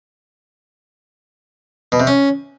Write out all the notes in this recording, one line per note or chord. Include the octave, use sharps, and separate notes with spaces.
B2
C3
C#4